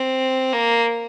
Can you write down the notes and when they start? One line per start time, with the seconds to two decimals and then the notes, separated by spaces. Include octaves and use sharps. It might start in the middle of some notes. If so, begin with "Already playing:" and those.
Already playing: C4
0.53 A#3